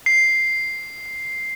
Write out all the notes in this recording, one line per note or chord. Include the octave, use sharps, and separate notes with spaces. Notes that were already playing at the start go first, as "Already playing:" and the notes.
C7